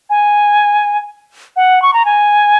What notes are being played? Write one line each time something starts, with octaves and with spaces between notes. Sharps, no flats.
G#5
F#5
C#6
A#5
G#5